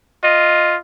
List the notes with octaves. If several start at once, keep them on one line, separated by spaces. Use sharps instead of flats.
F4 D#5